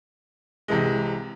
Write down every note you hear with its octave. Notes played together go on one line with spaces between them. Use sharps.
C2 C3 E3 G#3